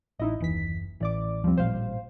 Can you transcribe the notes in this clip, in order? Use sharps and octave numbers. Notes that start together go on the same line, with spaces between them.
A1 D#4 E4 D#5
F#1 D#2 E3 B6
A1 E3 D5 D6
D#2 F3 G3 C4
A1 A#2 G3 C5 F5